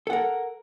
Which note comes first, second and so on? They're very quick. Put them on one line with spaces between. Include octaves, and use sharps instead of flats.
A4 F#5 A#4